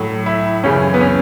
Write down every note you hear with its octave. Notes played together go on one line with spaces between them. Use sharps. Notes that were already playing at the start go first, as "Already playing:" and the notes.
Already playing: A2 F#3
E4
F#2 C#3 E3 C#4
B3
C#4